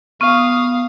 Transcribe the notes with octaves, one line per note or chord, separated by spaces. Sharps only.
B3 F5 C#6 D#6 F6